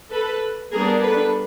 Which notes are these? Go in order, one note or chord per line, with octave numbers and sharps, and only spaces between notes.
A4 B4
G3 B3 D4 G#4 A#4
A4 B4